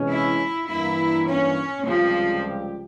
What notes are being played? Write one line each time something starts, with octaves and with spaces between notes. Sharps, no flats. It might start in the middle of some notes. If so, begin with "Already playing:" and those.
Already playing: C3 E3 G#3 C#4
E4
G2 E3 A#3 E4
C#4
C#2 C3 F3 G3 C4 G4